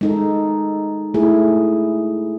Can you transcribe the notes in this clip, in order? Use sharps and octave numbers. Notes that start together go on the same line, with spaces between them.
G#3 D#4 A4
A3 E4 G#4